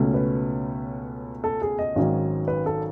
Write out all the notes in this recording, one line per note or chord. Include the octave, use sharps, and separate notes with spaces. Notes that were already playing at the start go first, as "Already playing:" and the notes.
Already playing: C#2 B2 A3 C#4
B4
A4
G#4
D#5
G#1 G#2 D#3 F#3 C#4
B4
A4